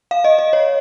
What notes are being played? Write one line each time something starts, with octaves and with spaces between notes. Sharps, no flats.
F5
D#5
D#5
C#5